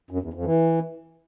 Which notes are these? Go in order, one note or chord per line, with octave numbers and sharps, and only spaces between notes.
F#2
E2
F2
E3